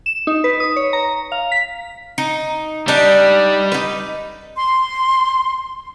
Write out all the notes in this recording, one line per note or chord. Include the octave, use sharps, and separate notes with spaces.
E7
D#4
B4
D#6
C#5
A#5
F5
B6
D#4
G3 D4 D#4 D5
D#4 B4
C6